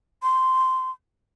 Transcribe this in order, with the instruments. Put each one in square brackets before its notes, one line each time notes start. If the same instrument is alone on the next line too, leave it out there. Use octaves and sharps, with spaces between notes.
[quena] C6